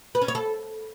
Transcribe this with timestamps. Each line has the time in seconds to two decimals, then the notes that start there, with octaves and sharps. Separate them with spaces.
0.15 B4
0.22 C#4
0.28 C#5
0.35 A4